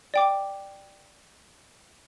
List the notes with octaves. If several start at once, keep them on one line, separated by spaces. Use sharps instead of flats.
D5 G5 D6